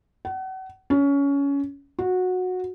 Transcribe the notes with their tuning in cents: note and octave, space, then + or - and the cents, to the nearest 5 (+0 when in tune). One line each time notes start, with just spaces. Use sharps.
F#5 +35
C#4 +20
F#4 -15